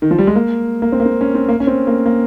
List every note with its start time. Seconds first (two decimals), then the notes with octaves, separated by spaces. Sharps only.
0.02 D#3
0.11 F3
0.18 G3
0.27 G#3
0.36 A#3
0.82 A#3
0.92 C4
1.00 A#3
1.05 C4
1.21 C#4
1.35 C4
1.49 A#3
1.60 C#4
1.67 C4
1.87 A#3
2.06 A#3